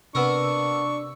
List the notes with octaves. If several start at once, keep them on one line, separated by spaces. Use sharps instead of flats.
C3 B3 D4 A#4 C#6 E6